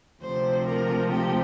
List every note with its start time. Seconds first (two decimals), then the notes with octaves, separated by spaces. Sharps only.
0.22 D2 C3 F3 C5
0.67 A#4
1.11 G4